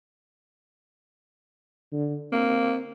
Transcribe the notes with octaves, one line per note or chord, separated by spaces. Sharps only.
D3
A#3 C4